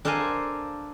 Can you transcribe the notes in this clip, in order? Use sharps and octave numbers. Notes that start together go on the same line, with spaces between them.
D4 A4 A#4 C5 F5 G#5